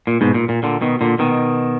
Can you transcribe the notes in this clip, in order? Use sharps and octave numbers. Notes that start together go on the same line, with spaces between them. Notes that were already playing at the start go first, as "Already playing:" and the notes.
A#2
G#2 B2
A#2
A#2
A#2 D3
B2 D#3
A#2 D3
B2 D#3